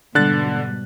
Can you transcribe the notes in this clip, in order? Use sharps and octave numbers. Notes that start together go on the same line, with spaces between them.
G#2 B2 D3 G3 F#6 A6